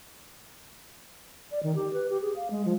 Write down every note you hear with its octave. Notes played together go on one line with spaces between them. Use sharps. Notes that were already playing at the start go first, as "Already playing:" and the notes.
D5
D#3
G4
B4
G4
G#4
F5
G#3
F3